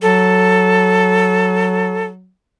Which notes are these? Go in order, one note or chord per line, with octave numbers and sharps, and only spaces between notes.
F#3 A4